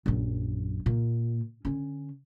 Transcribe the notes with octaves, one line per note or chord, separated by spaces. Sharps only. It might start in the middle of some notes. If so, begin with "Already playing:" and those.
A#1 F#2
A#2
D3 C#4